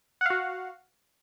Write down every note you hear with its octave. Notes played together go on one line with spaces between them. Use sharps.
F#4 F5 F#5